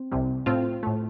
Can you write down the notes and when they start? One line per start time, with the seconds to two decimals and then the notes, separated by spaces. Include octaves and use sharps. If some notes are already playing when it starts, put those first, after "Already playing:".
Already playing: C4
0.12 C2 C3 G3
0.46 A2 A3 C4 F4
0.83 A2 A3